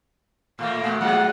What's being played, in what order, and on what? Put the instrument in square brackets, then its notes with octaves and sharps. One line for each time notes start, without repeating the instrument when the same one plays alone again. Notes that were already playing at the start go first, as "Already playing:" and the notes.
[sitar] A2 A3 A#3 [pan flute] F5
[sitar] A#2 [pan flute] A3
[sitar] F#3 G#3 F4 [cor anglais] F#5